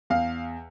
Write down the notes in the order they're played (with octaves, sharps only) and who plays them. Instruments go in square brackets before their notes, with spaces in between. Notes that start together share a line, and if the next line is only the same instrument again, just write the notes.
[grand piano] E2 F5